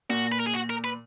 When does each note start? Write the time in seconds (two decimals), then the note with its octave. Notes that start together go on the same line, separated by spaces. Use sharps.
0.09 A#2 F#4
0.32 B4
0.40 A#4
0.47 G#4
0.54 F#4
0.70 A#4
0.84 B4